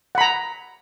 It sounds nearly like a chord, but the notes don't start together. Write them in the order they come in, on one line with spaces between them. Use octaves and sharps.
F#5 B5 A#5